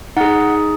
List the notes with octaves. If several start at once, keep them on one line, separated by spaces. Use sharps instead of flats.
D#4 G#4 F#5